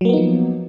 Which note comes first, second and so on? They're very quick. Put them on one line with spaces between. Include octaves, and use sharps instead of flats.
F#3 A#3 B3 D#4 F3